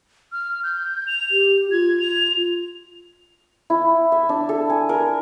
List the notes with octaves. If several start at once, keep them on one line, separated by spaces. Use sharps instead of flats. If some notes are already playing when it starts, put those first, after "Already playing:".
F6
G6
F7
G4
F4 G#6
F7
E4
E5
D4
A4
G#5
A#4